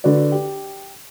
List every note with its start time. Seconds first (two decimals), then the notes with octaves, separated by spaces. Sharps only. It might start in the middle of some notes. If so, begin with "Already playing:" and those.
0.04 D3 F#4 B4 D5
0.32 G4